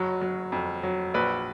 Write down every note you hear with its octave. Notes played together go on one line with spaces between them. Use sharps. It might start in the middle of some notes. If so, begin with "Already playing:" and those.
Already playing: F#1 F#3 C#5
F#3
F2
F#3
A#1 B4